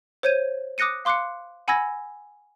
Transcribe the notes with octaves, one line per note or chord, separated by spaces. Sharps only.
C5 C#5 G6 G#6 D#7
D6 D#6 F#6 A#6 C#7 D#7
F5 C6 D6 F#6 C7 C#7
F#5 G#5 B5 E6 G#6 A#6